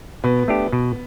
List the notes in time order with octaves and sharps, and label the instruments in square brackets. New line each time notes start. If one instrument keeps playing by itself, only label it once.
[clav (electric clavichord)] B2 [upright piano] B3
[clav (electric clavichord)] A3 D4 G4
B2